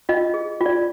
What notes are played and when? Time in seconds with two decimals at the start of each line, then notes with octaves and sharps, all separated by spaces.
0.09 F4 D#5
0.34 G#4
0.61 F4
0.66 D5